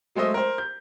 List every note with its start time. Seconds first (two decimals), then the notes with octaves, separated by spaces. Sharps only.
0.15 F#3 G#3 A3 C5 D#5 E5
0.34 A#4 C5
0.58 G6